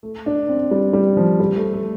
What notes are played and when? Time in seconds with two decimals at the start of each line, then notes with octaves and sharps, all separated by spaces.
0.03 A3
0.26 D4
0.49 C4
0.71 G3
0.93 G3
1.17 F3
1.40 G3
1.56 A3
1.74 A3